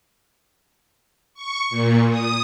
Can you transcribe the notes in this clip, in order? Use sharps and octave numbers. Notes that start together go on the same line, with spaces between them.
C#6
A#2
D#6